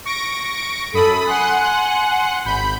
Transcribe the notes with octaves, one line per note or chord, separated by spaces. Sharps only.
C#6 A#6 D7
F#2 A4 B5 D#6
F#5 G#5 C6 F#6
G#1 B5 G6